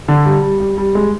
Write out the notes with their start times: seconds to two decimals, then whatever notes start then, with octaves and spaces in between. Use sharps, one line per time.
0.08 D3
0.25 G3
0.42 G3
0.60 G3
0.78 G3
0.95 G#3